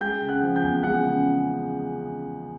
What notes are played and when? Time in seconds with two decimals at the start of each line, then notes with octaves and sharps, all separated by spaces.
0.01 G#3 G5 G6
0.21 C#3
0.29 F#5 F#6
0.42 F3
0.56 G5 G6
0.63 E2
0.83 G#3 F#5 F#6
1.04 C#3